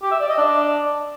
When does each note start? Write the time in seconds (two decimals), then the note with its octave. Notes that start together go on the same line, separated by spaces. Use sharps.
0.02 G4
0.11 E5
0.20 D5
0.29 D#5
0.38 D4